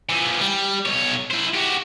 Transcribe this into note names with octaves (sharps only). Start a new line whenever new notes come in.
E3 F3
G3
B1 C#5
E4 C5
F#4 G4